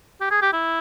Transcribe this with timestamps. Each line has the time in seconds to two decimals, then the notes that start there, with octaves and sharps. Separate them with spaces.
0.21 G4
0.31 G#4
0.42 G4
0.52 E4